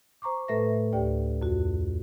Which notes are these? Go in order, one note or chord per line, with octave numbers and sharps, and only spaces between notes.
C5 A#5 C#6 D6
A2 A3 A4 B4 E5 A#6
D2 G4 D5 G5
F2 F#4